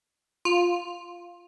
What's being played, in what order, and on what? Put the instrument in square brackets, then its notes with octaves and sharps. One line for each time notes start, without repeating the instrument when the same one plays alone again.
[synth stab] F4